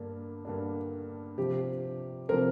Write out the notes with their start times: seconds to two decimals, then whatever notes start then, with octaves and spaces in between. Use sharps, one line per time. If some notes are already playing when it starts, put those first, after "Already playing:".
Already playing: G2 D3 A#3 D4
0.45 G2 D3 A#3 D4
1.38 C3 F3 C4 G4
2.29 C3 F3 C4 A#4